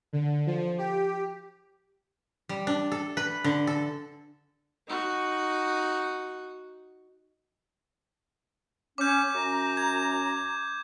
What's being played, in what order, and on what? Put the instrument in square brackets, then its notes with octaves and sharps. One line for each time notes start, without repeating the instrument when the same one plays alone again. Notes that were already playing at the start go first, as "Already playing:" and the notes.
[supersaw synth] D3
F3
G4
[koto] G3
D4
A4
B4
D3
A4
[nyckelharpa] D#4 F#4
[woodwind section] C#4 [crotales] D6 G6
[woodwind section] F#2 C#4 A#5
[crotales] G#6